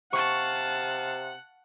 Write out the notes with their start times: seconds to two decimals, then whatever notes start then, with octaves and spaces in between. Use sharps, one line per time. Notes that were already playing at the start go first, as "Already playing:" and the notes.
0.13 C3 F5 F#5 A5 C#6